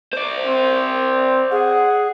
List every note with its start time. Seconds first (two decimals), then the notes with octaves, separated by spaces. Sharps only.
0.13 C5 D5
0.47 C4
1.52 G#4 F#5